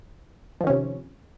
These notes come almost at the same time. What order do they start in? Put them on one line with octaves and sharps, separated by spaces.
F3 D#3 C#4 C3